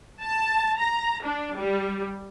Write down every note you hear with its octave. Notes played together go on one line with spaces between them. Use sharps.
A5
A#5
D4
G3